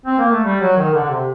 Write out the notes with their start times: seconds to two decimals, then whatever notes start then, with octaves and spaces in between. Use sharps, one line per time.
0.06 C4
0.18 A#3
0.31 A3
0.44 G3
0.61 F#3
0.77 D#3
0.94 D3
1.04 D3
1.10 C3